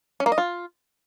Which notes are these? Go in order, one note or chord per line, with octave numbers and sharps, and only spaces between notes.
C#4
A#3
D#5
F4